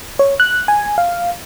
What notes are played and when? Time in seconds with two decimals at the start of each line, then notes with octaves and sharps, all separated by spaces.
0.19 C#5
0.40 F#6
0.68 G#5
0.98 F5